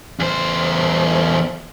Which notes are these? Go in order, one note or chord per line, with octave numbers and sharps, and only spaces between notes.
E2 C5